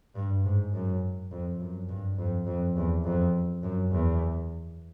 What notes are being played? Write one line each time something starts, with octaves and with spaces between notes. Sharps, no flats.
G2
G#2
F#2
F2
F#2
G2
F2
F2
E2
F2
F#2
E2